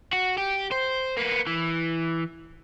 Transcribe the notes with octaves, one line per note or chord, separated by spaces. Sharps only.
F#4
G4
C5
A#3 B3
E3